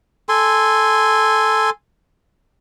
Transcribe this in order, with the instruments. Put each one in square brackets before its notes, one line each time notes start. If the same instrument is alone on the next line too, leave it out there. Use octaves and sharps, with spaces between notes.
[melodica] A4 G#5 C6